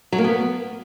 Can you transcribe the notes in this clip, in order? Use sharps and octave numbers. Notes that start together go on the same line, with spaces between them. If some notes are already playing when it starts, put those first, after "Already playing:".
F#3
A#3
B3